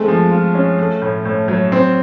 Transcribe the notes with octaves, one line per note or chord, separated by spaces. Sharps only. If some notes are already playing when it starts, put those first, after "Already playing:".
Already playing: G#3 A3 C4
F3
F4
C#4
A3
A2
A2
F#3
C4